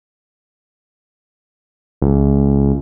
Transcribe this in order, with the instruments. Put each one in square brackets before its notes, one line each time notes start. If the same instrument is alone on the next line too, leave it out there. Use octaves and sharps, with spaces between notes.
[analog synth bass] C#2